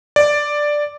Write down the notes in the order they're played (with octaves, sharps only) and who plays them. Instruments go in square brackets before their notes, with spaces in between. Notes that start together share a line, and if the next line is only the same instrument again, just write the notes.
[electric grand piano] D5